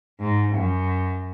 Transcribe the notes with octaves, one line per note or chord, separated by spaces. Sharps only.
G#2
F#2